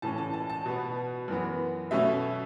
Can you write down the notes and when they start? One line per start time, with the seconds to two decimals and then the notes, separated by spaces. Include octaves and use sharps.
0.02 A2 E3 C#4 A5
0.18 A5
0.33 A5
0.50 A5
0.66 B2 B3
1.28 F#2 E3 B3
1.91 B2 F#3 A3 C#4 E5